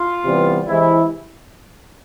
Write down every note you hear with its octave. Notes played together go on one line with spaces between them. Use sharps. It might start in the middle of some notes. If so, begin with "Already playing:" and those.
Already playing: F4
C3 E3 G3 B3
C3 E3 G#3 C4 E4